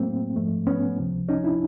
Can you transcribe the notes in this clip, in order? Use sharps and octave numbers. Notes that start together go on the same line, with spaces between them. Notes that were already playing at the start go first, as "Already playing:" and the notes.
Already playing: A2 F#3 A3 A#3 C4
G#2 F3 A3
B3 C#4
C#2 C3 F3
C#4 D#4
D4 E4